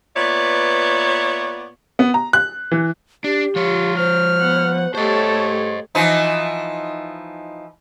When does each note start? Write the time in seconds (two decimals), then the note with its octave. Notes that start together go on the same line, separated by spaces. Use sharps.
0.16 A#2 B3 B4 C#5 D5 E5
1.99 B3
2.14 A#5
2.33 F#6
2.71 E3
3.24 D4 G4
3.56 F3 F4 C#5
3.97 C5 F6
4.40 B3 F#5
4.95 A3 G4 C5 C#5 D#5 A5 C#6
5.95 E3 F3 D#4